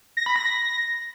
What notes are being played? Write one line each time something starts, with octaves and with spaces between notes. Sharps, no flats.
A#6
B5
A#6